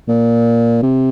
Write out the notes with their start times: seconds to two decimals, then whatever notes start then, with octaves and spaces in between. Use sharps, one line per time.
0.08 A#2
0.83 C3